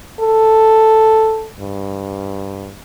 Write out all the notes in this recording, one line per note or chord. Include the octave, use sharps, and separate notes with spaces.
A4
G2